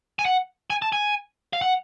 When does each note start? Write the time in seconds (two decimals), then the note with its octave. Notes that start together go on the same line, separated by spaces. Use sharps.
0.19 G#5
0.25 F#5
0.70 G#5
0.82 A5
0.93 G#5
1.53 F5
1.62 F#5